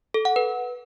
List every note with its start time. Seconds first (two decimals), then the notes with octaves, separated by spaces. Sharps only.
0.14 A4
0.25 F#5
0.36 B4